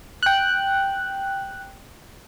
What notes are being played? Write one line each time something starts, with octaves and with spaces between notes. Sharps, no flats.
G5 F#6